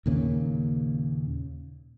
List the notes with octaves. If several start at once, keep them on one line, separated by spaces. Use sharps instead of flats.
D#2 A#2 C#3